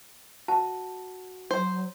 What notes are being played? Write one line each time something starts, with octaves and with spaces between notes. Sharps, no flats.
F#4 A5
F#3 C5